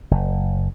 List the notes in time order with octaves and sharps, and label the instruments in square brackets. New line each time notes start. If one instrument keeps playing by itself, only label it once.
[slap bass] F#1